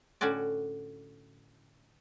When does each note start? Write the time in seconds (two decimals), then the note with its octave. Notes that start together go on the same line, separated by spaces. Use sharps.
0.21 A2 D3 C#4 F#4 D5